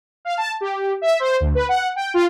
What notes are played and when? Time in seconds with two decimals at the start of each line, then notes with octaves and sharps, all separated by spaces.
0.25 F5
0.37 A5
0.61 G4
1.02 E5
1.20 C5
1.40 D2
1.55 B4
1.69 F#5
1.96 G5
2.14 F4